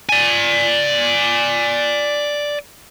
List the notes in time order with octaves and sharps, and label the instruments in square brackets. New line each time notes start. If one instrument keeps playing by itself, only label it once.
[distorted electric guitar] D5 G#5